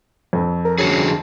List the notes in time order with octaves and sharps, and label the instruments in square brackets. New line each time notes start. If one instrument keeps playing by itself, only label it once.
[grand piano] F2
[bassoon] A#4
[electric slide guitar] D3 F#4 G#4 [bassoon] C#4